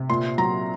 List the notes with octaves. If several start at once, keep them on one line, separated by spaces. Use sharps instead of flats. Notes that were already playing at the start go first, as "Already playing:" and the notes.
Already playing: C3
A#2 C6
F#3 A#5